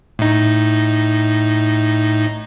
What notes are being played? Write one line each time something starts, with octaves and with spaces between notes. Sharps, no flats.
A2 D#4